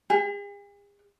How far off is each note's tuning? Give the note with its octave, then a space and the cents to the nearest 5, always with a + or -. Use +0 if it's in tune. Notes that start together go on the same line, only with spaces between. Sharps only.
G#4 -45